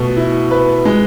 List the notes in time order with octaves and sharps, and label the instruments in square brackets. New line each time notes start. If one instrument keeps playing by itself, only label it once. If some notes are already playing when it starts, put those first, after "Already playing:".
Already playing: [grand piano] B2 A3
E4
B4
G#3